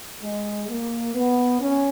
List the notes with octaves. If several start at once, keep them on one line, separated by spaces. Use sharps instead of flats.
G#3
A#3
B3
C#4